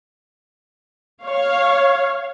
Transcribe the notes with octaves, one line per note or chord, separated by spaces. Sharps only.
C#5 F5